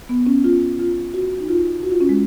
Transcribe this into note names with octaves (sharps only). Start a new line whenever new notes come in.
B3
C#4
F4
F4
F#4
D#4
F4
F#4
F4
C#4
G#3